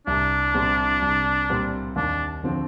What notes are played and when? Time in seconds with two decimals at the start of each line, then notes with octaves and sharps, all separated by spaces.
0.07 C2 D4
0.54 A#2 G3 C4
1.02 C2
1.50 A#2 G3 C4
1.96 D#2 D4
2.44 D3 F3 C4